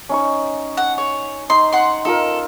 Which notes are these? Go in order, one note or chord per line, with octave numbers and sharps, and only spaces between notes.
C#4 D#4 C#6
F#5
C#5
D#4 C6
F#5 C6
D#4 F4 A4 A#4